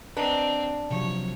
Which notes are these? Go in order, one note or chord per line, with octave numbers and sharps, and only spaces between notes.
C4 D4 B4 D#5 A#5
C3 F3 F#3 C#5